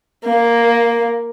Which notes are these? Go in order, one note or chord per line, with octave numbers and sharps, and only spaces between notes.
A#3